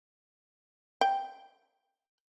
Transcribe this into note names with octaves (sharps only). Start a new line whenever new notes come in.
G5